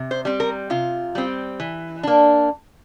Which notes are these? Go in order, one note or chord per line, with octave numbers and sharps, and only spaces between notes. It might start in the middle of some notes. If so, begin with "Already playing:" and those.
Already playing: C3
C5
G3 C4
A#4
C3 F4
G3 C4
E3
A#3 D4